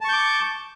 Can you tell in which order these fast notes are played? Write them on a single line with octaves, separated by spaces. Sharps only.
A5 C#6 G6 D6